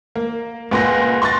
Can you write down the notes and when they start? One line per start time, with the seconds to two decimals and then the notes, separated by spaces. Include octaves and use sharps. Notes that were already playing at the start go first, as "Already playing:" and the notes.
0.16 A#3
0.71 C#2 A#2 B4 F#5 C6 A#6
1.22 C6 C#6 F#6 A6 A#6